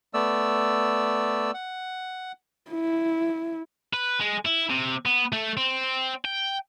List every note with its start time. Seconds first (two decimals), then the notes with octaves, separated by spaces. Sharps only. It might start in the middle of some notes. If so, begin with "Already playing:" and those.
0.14 A3 B3 D5 E6
1.54 F#5
2.71 E4
3.93 B4
4.20 G#3
4.45 E4
4.70 C3
5.06 B3
5.33 A3
5.57 C4
6.25 G5